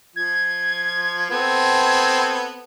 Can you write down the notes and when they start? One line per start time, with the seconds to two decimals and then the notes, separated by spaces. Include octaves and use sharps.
0.16 F3 G#6
1.30 B3 C4 A4 G#6